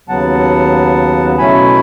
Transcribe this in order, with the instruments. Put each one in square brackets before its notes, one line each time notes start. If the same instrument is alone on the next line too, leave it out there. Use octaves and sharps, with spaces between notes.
[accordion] D#2 C#3 F#3 B3 F#5 A5
B2 F#3 A3 C#4 E4 G#5 B5